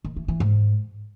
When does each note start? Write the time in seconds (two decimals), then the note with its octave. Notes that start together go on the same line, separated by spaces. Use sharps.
0.05 D#3
0.16 E3
0.28 E3
0.40 G#2